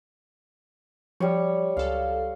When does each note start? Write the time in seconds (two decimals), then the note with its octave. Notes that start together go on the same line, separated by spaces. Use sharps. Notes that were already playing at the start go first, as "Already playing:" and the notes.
1.20 F3 G3 C#5
1.77 C#2 A4 F5